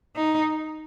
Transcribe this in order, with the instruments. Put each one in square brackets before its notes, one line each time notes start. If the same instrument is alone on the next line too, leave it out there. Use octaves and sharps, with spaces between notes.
[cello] D#4